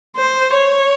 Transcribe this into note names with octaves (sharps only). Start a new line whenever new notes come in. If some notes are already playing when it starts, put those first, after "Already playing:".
C5
C#5